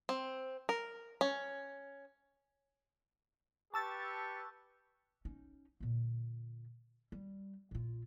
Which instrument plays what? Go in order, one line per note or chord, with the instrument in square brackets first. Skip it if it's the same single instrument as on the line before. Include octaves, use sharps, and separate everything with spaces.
[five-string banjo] C4
A#4
C#4
[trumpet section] G4 B4 C#6 [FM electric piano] A5 E6 A6
[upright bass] C#4 D#4
A#2 D3
G3
A#2 F4